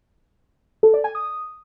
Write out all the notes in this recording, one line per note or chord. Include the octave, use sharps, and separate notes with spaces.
A4
D5
G#5
D#6